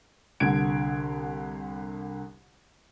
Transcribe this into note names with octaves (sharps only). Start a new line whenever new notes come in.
C2 D3 F#5 G#6 D7